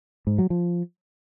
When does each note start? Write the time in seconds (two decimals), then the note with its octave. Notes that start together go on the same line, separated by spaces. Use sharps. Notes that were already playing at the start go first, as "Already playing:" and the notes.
0.27 G#2
0.39 F#3
0.50 F3